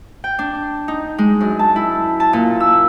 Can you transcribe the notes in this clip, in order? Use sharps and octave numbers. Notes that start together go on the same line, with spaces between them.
G5
D4
D#4
G#3
F#2
A5
E4
A5
A#2
E6